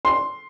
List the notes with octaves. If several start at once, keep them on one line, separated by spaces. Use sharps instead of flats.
C6